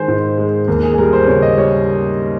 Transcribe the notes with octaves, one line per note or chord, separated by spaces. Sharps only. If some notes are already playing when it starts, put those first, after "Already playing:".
Already playing: D#3 G#3 C5 G#5
G#2
G#3
D#2 A#4
G#4
G#4
G3 A#4
C5
C#3 C#5
D#5
G3 C#5